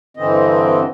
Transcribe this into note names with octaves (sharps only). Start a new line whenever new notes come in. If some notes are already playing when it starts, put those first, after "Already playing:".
G2 D3 E3 C4 D#5